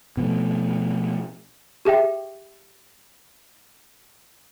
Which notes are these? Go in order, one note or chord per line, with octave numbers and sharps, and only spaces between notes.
B2 F3 A3
G4 G#4 E5 G5